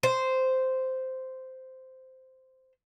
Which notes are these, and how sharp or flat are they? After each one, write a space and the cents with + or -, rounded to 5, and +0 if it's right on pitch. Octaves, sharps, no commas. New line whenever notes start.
C5 -10